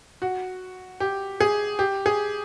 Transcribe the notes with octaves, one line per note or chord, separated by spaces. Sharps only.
F#4
G4
G#4
G4
G#4